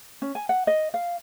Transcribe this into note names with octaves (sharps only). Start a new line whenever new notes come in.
C#4
G#5
F#5
D#5
F5